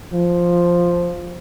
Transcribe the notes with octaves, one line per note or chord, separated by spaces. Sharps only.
F3